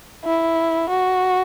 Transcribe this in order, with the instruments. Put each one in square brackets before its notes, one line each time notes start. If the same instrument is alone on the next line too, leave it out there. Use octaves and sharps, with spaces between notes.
[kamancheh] E4
F#4